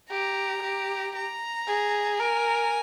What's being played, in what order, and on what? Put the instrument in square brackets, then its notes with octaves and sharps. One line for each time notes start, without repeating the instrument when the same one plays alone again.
[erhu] G4 [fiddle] A#5
[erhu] G4
[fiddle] A#5
[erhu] G#4
[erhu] A#4 [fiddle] G#5